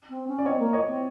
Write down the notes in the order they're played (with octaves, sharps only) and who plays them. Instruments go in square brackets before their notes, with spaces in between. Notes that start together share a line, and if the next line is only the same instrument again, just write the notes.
[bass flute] C4
C#4
[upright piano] D5
[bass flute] C4 [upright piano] C#5 D#5
[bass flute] A#3
[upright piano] C#5 D#5
[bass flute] C4